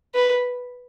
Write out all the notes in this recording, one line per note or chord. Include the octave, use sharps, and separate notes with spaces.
B4